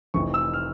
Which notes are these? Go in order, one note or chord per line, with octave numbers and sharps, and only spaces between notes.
F1 F2 E3 C#6
E6
F6